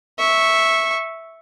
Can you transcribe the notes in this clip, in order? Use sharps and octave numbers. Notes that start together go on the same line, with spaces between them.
E5 C#6